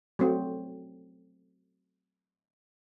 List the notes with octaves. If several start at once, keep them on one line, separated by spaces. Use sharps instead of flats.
F#3 A3 C4